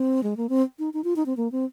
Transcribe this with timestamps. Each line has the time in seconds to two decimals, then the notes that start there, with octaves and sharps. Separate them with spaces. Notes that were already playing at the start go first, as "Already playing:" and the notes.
Already playing: C4
0.23 G#3
0.37 A#3
0.49 C4
0.79 D#4
0.94 D#4
1.04 F4
1.16 D#4
1.26 C4
1.37 A#3
1.52 C4